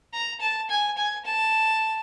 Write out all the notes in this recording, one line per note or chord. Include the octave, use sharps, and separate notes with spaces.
A#5
A5
G#5
G#5
A5